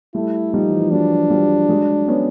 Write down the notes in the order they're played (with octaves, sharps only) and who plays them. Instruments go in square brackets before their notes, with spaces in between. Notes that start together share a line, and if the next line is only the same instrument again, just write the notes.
[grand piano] G3 A3 [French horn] E4
[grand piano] F3 G3 [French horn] D#4
[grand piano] E3
F3
[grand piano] E3 F#3 [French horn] D4
[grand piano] F3 G3
F#3 G#3
B3 C#4